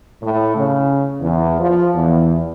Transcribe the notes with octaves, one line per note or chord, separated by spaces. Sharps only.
A2
C#3
E2
F3
E2